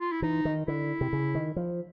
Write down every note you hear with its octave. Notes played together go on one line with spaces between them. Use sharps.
F4
E4
E3 D#4
D#3
D3 E4
C3
C#3
D#3
F3